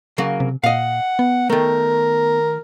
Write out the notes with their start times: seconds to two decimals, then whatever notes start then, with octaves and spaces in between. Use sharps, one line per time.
0.18 C#3 F#3 A#3
0.40 C3
0.64 A#2 D#5 F5 F#5
1.19 B3
1.50 D#3 A3 A#4